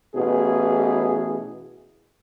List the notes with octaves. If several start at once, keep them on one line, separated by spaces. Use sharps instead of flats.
A1 B2 E3 G#4